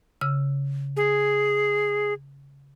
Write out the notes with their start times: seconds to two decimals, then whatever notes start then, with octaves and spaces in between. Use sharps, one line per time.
0.21 C#3 E6
0.97 G#4